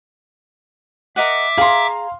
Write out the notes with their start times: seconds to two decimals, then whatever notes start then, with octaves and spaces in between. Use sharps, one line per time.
1.16 A#4 D#5 E5 F#5 D6
1.58 G#4 F5 A#5 C6